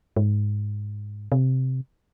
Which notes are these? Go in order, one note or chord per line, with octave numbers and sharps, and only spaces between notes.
G#2
C3